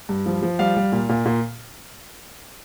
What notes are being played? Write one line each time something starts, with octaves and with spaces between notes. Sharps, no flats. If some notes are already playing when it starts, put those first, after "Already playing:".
G2
F3
F3
G3 F5
G3
A#2
A#2
A#2